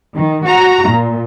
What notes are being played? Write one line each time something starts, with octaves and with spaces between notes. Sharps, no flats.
D#3
F#4 A#5
A#2